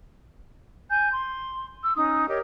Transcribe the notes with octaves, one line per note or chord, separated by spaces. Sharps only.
G#5 G6
C6
E6
C#4 D#4 D#6
G4 A#4 C#5 D#5